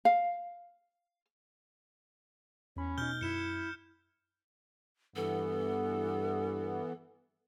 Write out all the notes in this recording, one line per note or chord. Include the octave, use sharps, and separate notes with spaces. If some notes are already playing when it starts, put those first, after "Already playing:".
F5
E2 C#4 B5
B2 D#4 F6 G6 G7
F#2 E4 C#7 E7
G2 E3 B3 A4